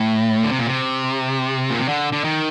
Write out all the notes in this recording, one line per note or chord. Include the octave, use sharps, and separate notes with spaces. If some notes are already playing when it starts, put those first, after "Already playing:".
Already playing: A2
D3
C3
A#2
C3
A#2
C3
D3
D3
D#3